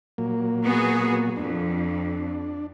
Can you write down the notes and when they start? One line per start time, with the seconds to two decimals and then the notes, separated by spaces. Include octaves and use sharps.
0.18 A#2 F#3 A#3
0.63 B3 F#4 G#4
1.37 F2 D4